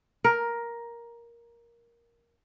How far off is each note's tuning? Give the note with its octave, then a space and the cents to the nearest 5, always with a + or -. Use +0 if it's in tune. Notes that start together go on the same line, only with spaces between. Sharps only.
A#4 +10